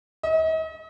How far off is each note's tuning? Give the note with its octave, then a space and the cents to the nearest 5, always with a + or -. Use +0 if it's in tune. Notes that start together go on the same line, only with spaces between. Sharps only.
D#5 +45